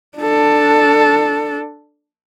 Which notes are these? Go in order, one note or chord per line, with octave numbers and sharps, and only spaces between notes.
D4 A4